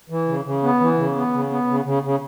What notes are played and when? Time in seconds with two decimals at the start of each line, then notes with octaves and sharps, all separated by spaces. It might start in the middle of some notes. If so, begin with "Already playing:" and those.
0.10 E3
0.28 C#3
0.45 C#3
0.63 B3
0.80 E3
0.98 C#3
1.16 B3
1.33 C#3
1.51 B3
1.68 C#3
1.85 C#3
2.03 C#3